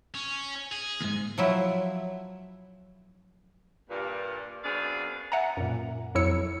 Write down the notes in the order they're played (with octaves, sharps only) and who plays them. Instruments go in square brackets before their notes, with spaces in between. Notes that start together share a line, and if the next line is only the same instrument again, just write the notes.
[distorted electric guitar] C#4
G#4
[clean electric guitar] D#2 G#2
[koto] F3 F#3 E4
[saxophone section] G2 A#2
F#2 B2 C4 D4 G#4 F5
[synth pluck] E5 F#5 G#5 A#5
F#2 A#2
F2 F#3 E4 C#5 E6 C#7